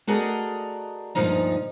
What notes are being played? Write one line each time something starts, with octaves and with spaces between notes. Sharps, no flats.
A3 F#4 G#4 A#4 D5 D#5
D2 G2 A#2 F3 D#4 A#5